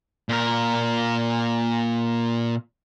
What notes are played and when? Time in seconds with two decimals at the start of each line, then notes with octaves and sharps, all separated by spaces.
0.29 A#2 A#4